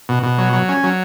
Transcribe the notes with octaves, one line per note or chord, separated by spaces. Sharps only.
B2
B2
F#3
F#3
C#4
F#3